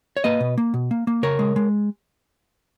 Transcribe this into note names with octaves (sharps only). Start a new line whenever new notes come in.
C#5
A#3 B4 D#5
B2
A#3
B2
A#3
A#3
C#3 A#4 C#5
G#3
G#3